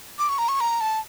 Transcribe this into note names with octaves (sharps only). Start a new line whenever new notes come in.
D6
C#6
A#5
C#6
A#5
A5